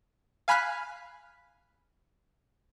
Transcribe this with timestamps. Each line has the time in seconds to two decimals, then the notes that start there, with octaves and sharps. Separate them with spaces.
0.48 F5 G#5 B5 F6 F#6 B6